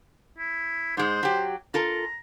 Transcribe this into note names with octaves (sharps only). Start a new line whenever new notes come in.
E4
G#2 G#3 C5
F#3 G4
F4 A4 A#4 A#5